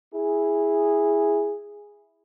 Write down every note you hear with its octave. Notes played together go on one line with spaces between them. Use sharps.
E4 G#4